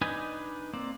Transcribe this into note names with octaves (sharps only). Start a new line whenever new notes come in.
D4 D#4 B4 D#5 G#5
A#3 C4 D5